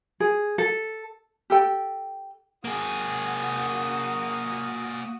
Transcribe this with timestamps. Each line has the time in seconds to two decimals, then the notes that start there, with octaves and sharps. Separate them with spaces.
0.20 G#4
0.58 A4
1.50 G4 A4 G5
2.65 A#3 F#4 G#4 D#6